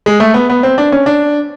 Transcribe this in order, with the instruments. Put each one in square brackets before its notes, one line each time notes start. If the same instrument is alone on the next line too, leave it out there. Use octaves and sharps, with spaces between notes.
[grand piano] G#3
A3
B3
B3
C4
D4
C#4
D4